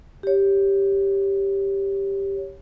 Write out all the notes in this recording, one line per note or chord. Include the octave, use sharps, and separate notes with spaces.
G4 C#5